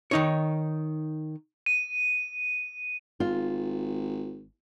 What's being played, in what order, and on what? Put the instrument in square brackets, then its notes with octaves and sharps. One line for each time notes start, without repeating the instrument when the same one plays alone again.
[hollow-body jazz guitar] D#3 D#4 C#5
[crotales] D#7
[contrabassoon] G#1 [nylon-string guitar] F4